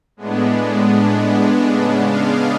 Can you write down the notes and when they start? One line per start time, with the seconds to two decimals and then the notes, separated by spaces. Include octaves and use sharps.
0.16 A2 G#3 B3 D4
1.65 C#3 G#3 B3 D4
2.02 F5